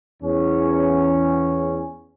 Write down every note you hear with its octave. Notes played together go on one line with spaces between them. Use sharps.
E2 C#4